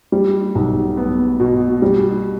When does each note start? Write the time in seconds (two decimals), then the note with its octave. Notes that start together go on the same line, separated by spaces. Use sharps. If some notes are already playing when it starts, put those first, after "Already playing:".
0.12 G3
0.55 B1
0.97 B3
1.40 B2
1.82 G3